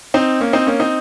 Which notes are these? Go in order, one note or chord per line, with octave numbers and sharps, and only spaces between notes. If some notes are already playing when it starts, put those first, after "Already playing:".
C4 D#4
A#3 C#4
C4 D#4
A#3 C#4
C4 D#4